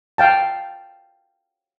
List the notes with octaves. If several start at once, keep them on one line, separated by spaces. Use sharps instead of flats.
F5 G5 A5